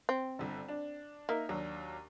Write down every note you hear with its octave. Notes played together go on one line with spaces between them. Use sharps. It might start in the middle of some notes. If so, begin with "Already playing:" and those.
C4
G1 D3
D4
A#3 D#4 A#4 E5
D#2 F#3 D4